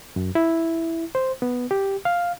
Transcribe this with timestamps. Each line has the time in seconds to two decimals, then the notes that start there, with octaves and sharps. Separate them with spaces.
0.16 F#2
0.35 E4
1.15 C5
1.42 B3
1.71 G4
2.05 F5